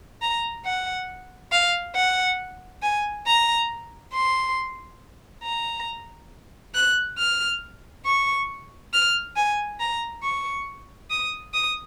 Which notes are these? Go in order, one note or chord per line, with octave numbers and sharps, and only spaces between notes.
A#5
F#5
F5
F#5
G#5
A#5
C6
A#5
F#6
F6
C#6
F6
G#5
A#5
C#6
D#6
D#6